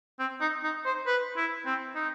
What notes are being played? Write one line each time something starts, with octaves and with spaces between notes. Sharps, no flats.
C4
D#4
D#4
C5
B4
E4
C4
D#4